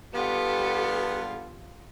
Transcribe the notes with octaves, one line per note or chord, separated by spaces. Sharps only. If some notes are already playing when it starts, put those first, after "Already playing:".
D3 G3 B3 F4 G4 A4